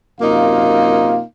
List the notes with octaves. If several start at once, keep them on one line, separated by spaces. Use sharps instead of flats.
F#2 C3 A#3 D#4 F4 F5